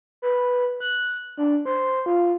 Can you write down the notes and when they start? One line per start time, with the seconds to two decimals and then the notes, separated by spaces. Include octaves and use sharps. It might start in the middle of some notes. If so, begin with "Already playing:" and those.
0.22 B4
0.80 F#6
1.37 D4
1.65 C5
2.06 F4